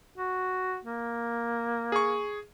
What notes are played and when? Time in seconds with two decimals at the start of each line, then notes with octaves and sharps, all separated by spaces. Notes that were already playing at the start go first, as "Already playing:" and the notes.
0.18 F#4
0.85 A#3
1.92 G#4 C#6